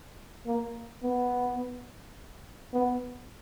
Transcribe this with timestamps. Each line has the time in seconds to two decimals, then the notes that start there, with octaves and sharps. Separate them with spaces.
0.46 A#3
1.03 B3
2.73 B3